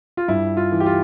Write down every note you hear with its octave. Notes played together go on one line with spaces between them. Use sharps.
F4
G2 E4
F4
E3
G4
F4